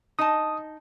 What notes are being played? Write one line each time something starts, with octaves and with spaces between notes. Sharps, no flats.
D#4 D#5 A5 D#6